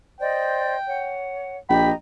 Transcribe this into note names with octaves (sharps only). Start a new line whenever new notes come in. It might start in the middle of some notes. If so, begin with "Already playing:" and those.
C5 D5 D#5 G5
C#5 F#5
A#1 G4 D#5 G5 A#5 B5